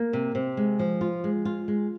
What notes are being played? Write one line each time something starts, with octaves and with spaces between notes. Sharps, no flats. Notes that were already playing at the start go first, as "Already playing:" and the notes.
Already playing: A#3
C3
C3
G#3
F3
F4
G#3
F4
G#3